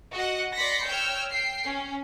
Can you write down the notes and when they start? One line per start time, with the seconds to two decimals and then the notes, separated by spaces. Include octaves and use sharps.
0.15 F#4 D#5 F#5
0.55 D5 B5 C6 A#6 B6 C#7
0.86 C#5 G5 E6 F6 G6
1.28 G5 C7
1.66 C#4